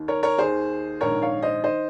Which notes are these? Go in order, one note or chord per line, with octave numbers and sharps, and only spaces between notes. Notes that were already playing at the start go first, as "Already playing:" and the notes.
Already playing: D#2 D#3
A#4 C#5
A#4 C#5
D#2 D#3 G#4 C5
A#1 G#2 D#3 A#4 C#5
C#5 F5
C5 D#5
D#3 C5 D#5